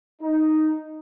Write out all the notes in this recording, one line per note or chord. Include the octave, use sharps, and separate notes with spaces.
D#4